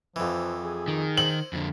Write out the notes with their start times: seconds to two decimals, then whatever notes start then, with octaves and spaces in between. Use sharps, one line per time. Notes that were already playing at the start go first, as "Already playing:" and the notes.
0.16 F2 E3 F3
0.63 G#4
0.88 D#3
1.18 C5 F#7
1.53 F2 D3